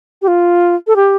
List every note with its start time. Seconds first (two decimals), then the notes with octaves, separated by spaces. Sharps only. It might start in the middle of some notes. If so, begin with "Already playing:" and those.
0.22 G4
0.28 F4
0.87 A4
0.96 G4